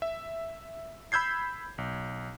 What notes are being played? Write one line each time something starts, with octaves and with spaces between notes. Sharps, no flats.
E5
B5 E6 G6 G#6 C7
B1